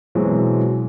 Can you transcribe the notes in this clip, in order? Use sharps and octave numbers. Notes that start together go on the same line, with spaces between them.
B2 E3 F#3 G#3 C4